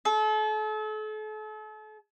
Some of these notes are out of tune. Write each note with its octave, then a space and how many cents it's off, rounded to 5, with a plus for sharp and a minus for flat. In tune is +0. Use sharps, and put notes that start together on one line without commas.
A4 -40